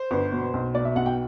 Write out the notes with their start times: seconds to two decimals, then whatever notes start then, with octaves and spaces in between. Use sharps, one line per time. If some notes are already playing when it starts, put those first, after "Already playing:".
Already playing: C5
0.11 G1
0.32 B2
0.53 B1
0.74 B2 D5
0.85 E5
0.96 B1 F#5
1.06 G5